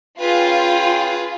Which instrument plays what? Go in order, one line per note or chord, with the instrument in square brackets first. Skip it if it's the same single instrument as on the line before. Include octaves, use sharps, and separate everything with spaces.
[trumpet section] C#4 G5 [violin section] F4 [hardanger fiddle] G#4 B4